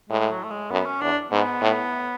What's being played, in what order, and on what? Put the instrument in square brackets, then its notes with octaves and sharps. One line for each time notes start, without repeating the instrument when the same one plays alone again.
[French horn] A2 [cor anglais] G#3
[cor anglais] F#3
A3
G#3
[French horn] F#2 [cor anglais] B3
[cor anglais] C#4
[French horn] E2 [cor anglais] D4
[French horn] G#2 [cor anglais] B3
[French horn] A2